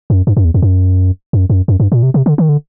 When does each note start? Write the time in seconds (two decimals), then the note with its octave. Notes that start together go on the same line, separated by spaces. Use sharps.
0.10 F#2
0.27 G2
0.37 F#2
0.45 E2
0.54 F2
0.62 F#2
1.33 F#2
1.50 F#2
1.68 F#2
1.80 G2
1.92 A#2
2.03 C3
2.14 C3
2.26 D3
2.38 D#3
2.49 D3